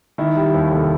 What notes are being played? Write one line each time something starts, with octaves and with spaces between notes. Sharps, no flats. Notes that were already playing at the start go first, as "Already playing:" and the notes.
D#3 E4
G3
D#2
F1